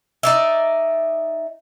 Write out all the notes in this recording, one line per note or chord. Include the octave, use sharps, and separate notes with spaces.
D#4 D5 E5